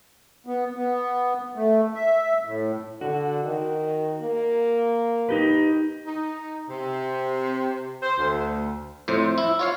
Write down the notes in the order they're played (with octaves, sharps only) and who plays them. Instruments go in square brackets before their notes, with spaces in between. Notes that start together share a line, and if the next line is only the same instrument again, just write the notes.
[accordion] B3
B3
A3
E5
A2
[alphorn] D3 [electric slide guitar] F#4
[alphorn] D#3
A#3
[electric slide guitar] D#4 G4 B4
[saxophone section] D#4
C3
C5
D2
[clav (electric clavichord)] F2 A2 C5
E4
F4 C#5 F5